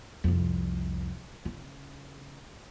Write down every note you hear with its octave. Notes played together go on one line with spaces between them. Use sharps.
C2 F2
C#3